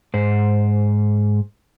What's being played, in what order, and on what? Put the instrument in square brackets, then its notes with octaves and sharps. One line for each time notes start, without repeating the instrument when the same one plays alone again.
[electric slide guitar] G#2 C5